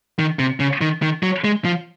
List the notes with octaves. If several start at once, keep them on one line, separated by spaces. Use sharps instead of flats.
D#3
C3
C#3
D#3
D#3
F#3
G#3
F3